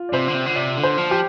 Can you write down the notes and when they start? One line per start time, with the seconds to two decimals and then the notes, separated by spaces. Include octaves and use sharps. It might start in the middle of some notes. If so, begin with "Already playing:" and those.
Already playing: F4
0.09 D5
0.13 C3 C5
0.28 D3
0.34 C3
0.46 D3
0.55 C3 D5
0.77 D3
0.84 C5
0.98 F3
1.11 G4